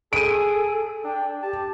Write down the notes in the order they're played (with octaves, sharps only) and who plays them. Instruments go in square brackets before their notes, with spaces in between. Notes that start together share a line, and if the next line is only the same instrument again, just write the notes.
[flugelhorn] G#4 [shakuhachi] A4 [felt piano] D7 D#7
[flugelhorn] D4 [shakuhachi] G5
[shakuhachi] G4 [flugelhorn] A5